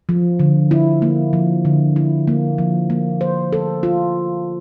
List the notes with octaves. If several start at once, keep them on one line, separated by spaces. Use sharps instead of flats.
F3
D3
E4
A#3
F3
D3
E4
A#3
F3
A#3
C5
A4
F4